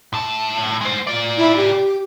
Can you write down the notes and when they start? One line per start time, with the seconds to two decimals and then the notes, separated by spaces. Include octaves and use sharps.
0.14 A2 A5
0.81 G#3 C5
1.07 F4 D5
1.37 E4
1.57 G4